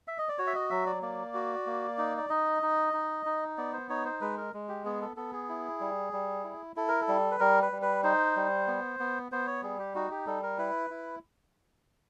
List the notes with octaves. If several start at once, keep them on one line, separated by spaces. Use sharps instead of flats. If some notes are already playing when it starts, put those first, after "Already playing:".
E5
D#5
D5
F#4 C#5
E5
D#5
F#3 E5
D5
A#3 D5
F#4
A#3
D#4
D5
D#4 D#5
D#4
D#4
D#4
B3 D5
C5
D#4 C#5
C5
G#3 B4
A#4
G#3
G4
B3 G#4
A4
B3 A4
G#4
E4
G3
G3
E4
E4 A4
A#4
A4
G3
B4
G3 A#4
B4
G3
B4
D#4 C5
G3
B3
B3
B3 C5
C#5
G3 G#4
G4
D#4 F#4
G4
G3 A4
A#4
E4 B4
E4